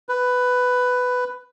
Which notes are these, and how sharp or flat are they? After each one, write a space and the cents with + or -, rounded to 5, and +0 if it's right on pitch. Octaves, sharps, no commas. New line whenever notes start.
B4 +10